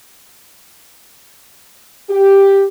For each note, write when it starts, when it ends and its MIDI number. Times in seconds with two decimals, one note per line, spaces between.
2.10 2.65 67